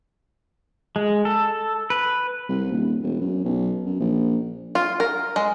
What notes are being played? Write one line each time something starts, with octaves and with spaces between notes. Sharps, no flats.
G#3
A4
B4
C2
D#1
E1
F#2
B1
F#2
A#1
F4
A#4
G#3